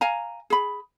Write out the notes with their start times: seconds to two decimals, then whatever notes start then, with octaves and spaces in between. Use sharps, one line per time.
0.01 F5 G#5 A#5
0.50 G#4 B5